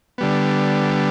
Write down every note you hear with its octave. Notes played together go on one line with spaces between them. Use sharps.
D3 G3 B3